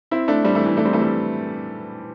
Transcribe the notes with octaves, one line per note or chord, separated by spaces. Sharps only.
C4 E4
A3 D4
G3 C4
E3 A3
E3 A3
A3 D4
G3 C4
E3 A3
G3 C4